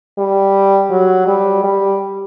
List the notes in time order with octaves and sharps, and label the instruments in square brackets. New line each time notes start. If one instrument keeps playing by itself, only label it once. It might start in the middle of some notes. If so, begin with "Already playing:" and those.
[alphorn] G3
F#3
G3
G3